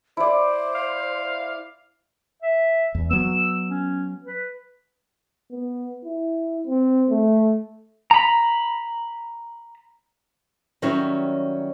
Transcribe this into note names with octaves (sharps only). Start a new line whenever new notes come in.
E4 C5 D5
F5
E5
E2
F#3 B3 E6
C#4
B4
B3
E4
C4
A3
A#5 B5
D#3 F#3 G3 C#4 E4 C#5